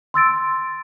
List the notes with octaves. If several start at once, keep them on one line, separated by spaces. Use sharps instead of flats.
C6 E6 A6 D7